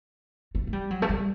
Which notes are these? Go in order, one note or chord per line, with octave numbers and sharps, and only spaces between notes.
A3
A3
G3
F#3
A3
G3